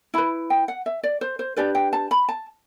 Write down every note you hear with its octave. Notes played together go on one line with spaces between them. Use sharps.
E4 B4 B5
G5
F#5
E5
D5
C5
C5
D4 G4 B4 D5
G5
A5
B5
A5